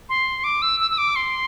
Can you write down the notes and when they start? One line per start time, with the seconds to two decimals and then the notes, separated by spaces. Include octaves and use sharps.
0.09 C6
0.44 D6
0.62 E6
0.80 E6
0.91 E6
0.98 D6
1.16 C6